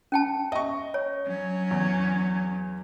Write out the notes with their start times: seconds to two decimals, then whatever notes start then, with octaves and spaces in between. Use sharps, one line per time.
0.12 C#4 G5 A5
0.52 D#5 E5 C#6
0.94 C#5
1.26 F#3 C#4
1.71 E2